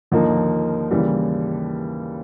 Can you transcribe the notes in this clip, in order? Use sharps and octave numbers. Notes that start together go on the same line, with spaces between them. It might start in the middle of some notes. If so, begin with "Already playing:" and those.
D#2 D3 F3 A#3 D#4
D#2 C#3 E3 G3